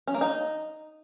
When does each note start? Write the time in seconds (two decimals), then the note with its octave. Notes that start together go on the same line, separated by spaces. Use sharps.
0.07 C#4
0.14 A#3
0.21 D#4